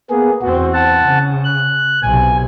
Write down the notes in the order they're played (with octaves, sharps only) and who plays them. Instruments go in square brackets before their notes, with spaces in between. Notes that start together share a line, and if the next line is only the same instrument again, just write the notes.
[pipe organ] A#3 B3 G#4
[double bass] E2 C4 [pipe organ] F#4
[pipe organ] F#5 A5
[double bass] C#3
[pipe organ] F#6
[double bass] B1 C3 [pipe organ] G#5